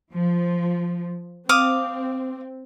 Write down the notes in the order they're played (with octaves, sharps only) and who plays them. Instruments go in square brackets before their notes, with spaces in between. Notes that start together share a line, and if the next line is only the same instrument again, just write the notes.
[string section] F3
[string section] C4 [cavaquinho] F5 D6 D#6